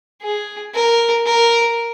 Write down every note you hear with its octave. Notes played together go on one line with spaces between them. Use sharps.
G#4
A#4
A#4